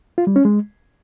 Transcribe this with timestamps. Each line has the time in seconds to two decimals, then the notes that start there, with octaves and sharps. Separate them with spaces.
0.18 F4
0.27 G3
0.36 C#4
0.45 G#3